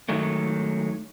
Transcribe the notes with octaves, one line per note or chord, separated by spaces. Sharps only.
D#3 F#3 G#3 A3